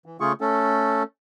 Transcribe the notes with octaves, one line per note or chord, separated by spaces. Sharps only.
E3
C#3 A3 F4 G#4 C#6
A3 C#4 A4